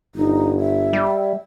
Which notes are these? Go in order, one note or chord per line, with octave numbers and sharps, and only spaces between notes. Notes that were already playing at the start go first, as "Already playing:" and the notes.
G1 D#4
E5
G3